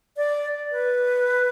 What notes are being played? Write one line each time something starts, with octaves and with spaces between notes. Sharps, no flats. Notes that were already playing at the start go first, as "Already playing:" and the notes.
D5
B4